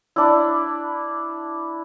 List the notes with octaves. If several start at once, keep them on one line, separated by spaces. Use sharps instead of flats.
D4 E4